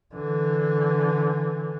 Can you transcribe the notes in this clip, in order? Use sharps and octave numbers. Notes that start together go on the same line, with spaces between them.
D3 E3